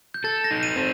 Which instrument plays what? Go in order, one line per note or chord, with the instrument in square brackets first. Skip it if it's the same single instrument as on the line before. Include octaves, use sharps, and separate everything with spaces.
[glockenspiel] G6
[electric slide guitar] A4 [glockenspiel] A6
[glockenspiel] A#6
[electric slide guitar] D#4
[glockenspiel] D#7
[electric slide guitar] C4